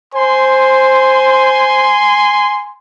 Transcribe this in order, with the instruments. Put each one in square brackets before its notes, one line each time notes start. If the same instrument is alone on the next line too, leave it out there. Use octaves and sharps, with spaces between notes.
[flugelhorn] C5 [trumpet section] G#5 C6